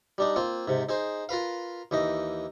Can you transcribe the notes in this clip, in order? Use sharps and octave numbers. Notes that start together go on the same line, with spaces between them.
G3 D4 D#4
A#3 C4 F4
G#2 C3
D#4 G#4 C5
F4 A#4 B4 F5
D#2 E3 D#4 D#5